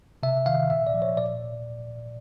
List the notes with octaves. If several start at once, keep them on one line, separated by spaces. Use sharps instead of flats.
C3 E5
D#3 F5
A#2 E5
D5
F3
C#5
A#2 D5